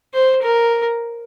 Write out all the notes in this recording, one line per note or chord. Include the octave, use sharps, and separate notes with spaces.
C5
A#4